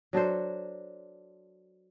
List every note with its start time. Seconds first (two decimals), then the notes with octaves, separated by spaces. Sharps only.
0.13 F#3 D4 A4 C5